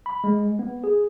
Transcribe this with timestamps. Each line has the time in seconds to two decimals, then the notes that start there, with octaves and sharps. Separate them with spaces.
0.06 B5
0.24 G#3
0.59 B3
0.84 G#4